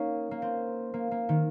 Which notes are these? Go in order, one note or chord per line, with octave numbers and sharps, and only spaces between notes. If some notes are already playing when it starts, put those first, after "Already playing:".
Already playing: A#3 C#4 D#4
A#3
C4
A#3
A#3
D#3